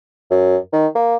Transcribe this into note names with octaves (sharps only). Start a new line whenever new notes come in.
F#2
D#3
A#3